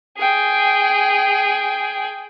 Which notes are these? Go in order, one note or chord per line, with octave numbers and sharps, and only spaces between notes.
G#4 G5